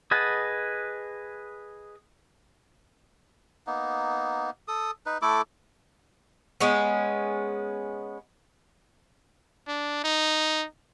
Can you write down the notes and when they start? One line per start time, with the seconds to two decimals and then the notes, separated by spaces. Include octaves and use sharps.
0.11 G#4 B4 D#5 F#5 A5
3.67 A#3 B3 D#4
4.68 A4 D#6
5.06 D#4 B4
5.22 A3 E4 A4 D6
6.61 G#3 B3 C#4
9.67 D4
10.04 D#4